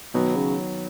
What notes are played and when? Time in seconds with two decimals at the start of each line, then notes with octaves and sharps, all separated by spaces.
0.14 B2 D#3 F#3 B3
0.35 C#3